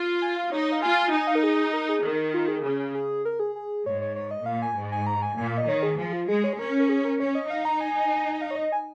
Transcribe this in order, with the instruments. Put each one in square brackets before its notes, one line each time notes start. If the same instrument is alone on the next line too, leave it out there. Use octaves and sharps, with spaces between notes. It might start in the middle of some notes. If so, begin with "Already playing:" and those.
Already playing: [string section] F4
[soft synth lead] G#5
F5
[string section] D#4 [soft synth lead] C#5
[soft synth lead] C#5
F5
[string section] F4 [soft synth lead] G#5
[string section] D#4 [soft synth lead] G#5
[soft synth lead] F5
A#4
G#4
A#4
G#4
[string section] D#3
[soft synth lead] F4
G#4
[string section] C#3 [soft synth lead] G#4
[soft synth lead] G#4
G#4
A#4
G#4
G#4
[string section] G#2 [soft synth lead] C#5
[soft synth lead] C#5
C#5
D#5
[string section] A#2 [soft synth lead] F5
[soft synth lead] G#5
[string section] G#2
[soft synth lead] G#5
A#5
G#5
[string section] A#2 [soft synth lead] G#5
[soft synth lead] F5
D#5
[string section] D#3 [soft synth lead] C#5
[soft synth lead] G#4
[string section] F3 [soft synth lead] G#4
[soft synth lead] F4
[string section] G#3 [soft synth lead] G#4
[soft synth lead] C#5
G#4
[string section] C#4 [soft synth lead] A#4
[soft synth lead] A#4
G#4
A#4
[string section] C#4 [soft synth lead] C#5
[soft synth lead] D#5
[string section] D#4 [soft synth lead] F5
[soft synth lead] A#5
G#5
F5
C#5
D#5
G#5